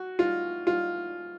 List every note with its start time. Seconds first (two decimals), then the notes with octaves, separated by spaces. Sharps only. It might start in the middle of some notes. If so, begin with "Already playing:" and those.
Already playing: F#4
0.19 F4
0.67 F4